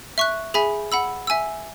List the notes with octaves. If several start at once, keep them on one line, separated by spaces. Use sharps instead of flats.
E5 C#6 F#6
G#4 E5 G#5 B5
F#5 B5 E6
E5 G#5 E6